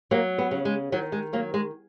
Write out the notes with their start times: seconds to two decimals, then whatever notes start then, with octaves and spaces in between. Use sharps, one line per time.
0.11 F#3 A#3
0.38 B3
0.51 C#3
0.65 G#3
0.92 D#3 F#3
1.12 G#3
1.33 F#3 A#3
1.54 G#3